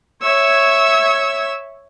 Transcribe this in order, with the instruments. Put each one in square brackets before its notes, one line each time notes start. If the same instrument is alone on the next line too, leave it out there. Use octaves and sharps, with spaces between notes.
[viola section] C#5 E5 [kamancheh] E6